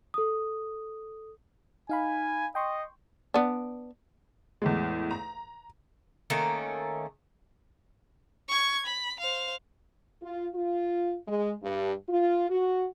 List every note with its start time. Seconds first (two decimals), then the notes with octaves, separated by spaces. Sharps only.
0.14 A4 D#6
1.89 D#4 F5 G#5 B5
2.55 D#5 G5 C6 C#6
3.34 B3 D4
4.62 E2 A2 G#3
5.11 A#5
6.30 D#3 A3 A#3 C#4
8.49 C#6 G#6
8.86 B5
9.20 C5 F5
10.22 F4
10.55 F4
11.27 G#3
11.63 G2
12.08 F4
12.49 F#4